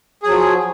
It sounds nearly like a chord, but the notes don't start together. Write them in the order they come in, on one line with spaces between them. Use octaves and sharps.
G#4 F#3 F3